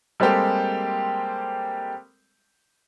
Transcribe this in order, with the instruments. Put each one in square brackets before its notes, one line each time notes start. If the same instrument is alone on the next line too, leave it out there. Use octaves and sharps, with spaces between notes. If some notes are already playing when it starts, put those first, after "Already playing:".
[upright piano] G3 G#3 A#3 C4 G4 A4